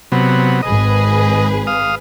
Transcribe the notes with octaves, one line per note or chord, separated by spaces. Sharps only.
C3 F#3 B3
G#1 G#4 B4 D#5
F5 D#6